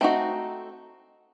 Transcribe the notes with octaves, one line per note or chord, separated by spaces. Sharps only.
A3 C4 D#4 F#4